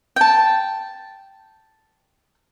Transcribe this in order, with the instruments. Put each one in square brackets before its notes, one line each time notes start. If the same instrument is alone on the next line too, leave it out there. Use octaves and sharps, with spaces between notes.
[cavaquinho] G5 A5